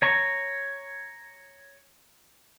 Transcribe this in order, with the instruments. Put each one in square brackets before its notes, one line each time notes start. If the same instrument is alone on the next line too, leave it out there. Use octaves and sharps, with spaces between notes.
[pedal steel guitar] C#5 A#5 C#6